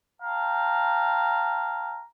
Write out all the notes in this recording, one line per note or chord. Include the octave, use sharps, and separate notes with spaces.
F5 G5 A5 A#5